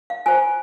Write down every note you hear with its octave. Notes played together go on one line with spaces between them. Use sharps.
F5
F4 C5 G#5